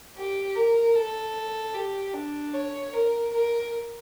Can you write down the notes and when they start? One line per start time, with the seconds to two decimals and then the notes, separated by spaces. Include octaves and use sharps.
0.16 G4
0.55 A#4
0.95 A4
1.74 G4
2.14 D4
2.54 C#5
2.94 A#4
3.33 A#4